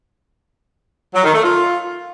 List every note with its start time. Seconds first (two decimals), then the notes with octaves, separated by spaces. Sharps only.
1.14 F#3
1.24 D#3
1.33 A3
1.43 F4